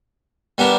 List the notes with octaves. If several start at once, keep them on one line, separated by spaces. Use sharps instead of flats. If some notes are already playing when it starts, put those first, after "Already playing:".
G3 B3 D4 G4 A#4